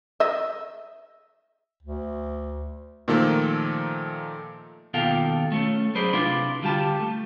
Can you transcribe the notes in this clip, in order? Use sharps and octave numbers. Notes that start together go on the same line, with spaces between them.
D#5 E5
D2
A#2 D#3 F3 A3 A#3 A4
D#2 B2 F4 A4 F5 G5
A3 C#4 A4
F#3 G#4 B4 C5 D5
C3 D4 E4 F4 B4 C6
D3 G3 F4 G4 A5
A3